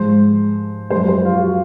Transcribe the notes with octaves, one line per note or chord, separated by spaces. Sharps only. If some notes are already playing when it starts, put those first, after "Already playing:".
Already playing: G#2 F3 G#3 C5
F#2 F3 G#3 C5
C5
F4
F#4
F4